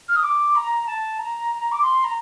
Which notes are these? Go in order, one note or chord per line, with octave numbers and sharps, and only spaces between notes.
F6
D#6
D6
A#5
A5
A#5
D6
C6
A#5